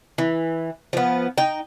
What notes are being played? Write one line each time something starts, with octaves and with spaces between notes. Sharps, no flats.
E3
F3 B3
D#4 G5